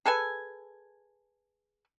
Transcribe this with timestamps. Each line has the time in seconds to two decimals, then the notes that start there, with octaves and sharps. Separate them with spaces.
0.06 G#4 A4 B4 G#5